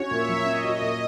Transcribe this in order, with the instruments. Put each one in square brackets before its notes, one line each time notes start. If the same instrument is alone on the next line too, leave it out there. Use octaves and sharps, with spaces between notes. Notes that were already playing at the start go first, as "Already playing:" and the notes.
Already playing: [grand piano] C#4 F#4 [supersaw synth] C#5
[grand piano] A#2 [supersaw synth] E5
[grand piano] F#3
[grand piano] C#4 [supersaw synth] D#5
[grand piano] F#4
A#2